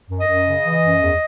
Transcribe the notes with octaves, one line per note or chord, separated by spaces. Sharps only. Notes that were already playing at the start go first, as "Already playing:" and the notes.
F#2
D#5
F#2
C#3
E3
F#2
E2